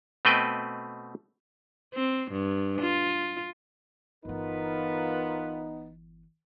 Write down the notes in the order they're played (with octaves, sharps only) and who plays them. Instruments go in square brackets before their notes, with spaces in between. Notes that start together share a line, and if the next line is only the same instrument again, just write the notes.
[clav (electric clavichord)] B2 A3 C4 B4 D#5 G5
[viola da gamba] C4
G2
F4
[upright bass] G1 E3 [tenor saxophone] B3 [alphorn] D#4 [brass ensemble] F4 A#4 B4